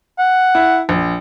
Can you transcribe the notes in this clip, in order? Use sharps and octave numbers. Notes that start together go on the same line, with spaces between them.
F#5
E4
A#1